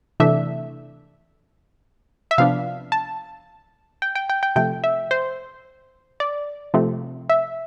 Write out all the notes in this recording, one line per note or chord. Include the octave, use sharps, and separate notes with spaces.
C3 E3 A3 D4 E5
E5
C3 F3 B3 D4 F5
A5
G5
G5
G5
G5
C3 F3 A3 G5
E5
C5
D5
C3 F3 A3 C4
E5